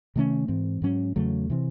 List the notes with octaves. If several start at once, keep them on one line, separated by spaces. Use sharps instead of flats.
C3 D#3 A3 C#4
G#2 E3 C4
G#2 F#3 C#4
E2 C#3 F#3 A3
C3 E3 C4